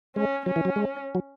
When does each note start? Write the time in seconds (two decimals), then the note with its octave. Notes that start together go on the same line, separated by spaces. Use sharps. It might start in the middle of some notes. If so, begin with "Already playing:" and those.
0.16 G#3 C#4
0.46 F#3 C#4
0.56 E3
0.65 F#3
0.76 G#3
1.15 F#3